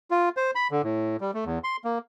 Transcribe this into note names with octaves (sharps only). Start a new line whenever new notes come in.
F4
C5
B5
D3
A2
G3
A3
E2
C6
A#3